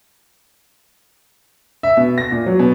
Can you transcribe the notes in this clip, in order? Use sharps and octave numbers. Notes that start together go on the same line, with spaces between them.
E5
B2
A#6
A#2
F#3
B2